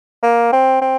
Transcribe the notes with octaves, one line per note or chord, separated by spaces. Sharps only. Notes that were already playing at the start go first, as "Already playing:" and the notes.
A#3
C4
C4